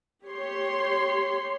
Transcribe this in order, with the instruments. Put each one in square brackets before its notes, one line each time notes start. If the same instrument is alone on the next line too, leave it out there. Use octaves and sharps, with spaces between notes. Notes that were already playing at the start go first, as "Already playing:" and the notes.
[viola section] G4 C#5 C6